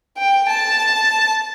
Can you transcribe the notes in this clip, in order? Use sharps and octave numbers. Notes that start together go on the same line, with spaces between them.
G5
A5